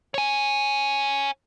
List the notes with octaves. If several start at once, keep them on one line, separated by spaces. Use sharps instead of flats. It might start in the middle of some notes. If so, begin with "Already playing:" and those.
C#5 G#5